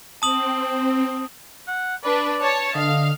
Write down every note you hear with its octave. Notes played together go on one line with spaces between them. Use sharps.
C4 A5 D#6 F#7
F#5
D4 B4 D5
C#5 A5
D3 D#5 F5